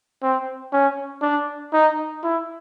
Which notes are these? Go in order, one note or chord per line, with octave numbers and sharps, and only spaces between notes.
C4
C#4
D4
D#4
E4